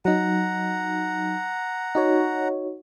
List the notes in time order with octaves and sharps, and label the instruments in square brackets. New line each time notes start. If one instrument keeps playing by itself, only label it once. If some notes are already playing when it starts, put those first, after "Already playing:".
[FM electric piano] F#3 D#4 [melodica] F#5 A#5
[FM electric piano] D#4 F#4 C#5